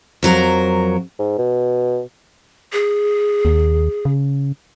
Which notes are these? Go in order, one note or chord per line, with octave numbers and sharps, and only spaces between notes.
F2 F#3 A#4 A#5
G#2
B2
G#4
D#2
C#3